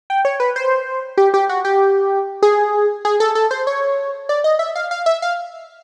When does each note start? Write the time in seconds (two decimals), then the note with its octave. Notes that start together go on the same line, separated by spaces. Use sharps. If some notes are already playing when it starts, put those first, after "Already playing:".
0.10 G5
0.25 C#5
0.40 B4
0.56 C5
1.18 G4
1.34 G4
1.49 F#4
1.65 G4
2.43 G#4
3.05 G#4
3.20 A4
3.35 A4
3.51 C5
3.67 C#5
4.29 D5
4.44 D#5
4.59 E5
4.75 F5
4.91 F5
5.06 E5
5.22 F5